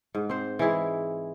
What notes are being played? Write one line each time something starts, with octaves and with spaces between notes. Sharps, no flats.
G#2
C4 C5
E3 G#3 E4 G#4